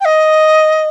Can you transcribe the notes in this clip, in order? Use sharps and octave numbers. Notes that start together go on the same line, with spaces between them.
G5
D#5